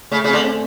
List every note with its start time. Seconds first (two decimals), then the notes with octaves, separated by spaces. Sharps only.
0.12 C#3 A3
0.24 C#3 C4
0.33 D3
0.44 C4